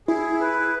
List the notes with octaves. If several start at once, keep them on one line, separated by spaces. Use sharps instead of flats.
E4 G#4
B4